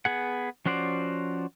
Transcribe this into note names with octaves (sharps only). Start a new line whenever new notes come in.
B3 G#4 F#5
F3 C#4 F#4 C5 D5